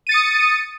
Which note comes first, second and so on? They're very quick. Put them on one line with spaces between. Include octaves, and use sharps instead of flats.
D#7 A6 C#7 D#6